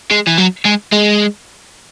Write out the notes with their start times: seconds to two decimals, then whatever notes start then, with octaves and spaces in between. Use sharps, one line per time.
0.11 G#3
0.27 E3
0.38 F#3
0.65 G#3
0.92 G#3